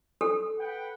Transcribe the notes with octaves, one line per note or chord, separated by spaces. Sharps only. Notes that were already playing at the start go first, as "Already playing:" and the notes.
A4
B4 F#5 G5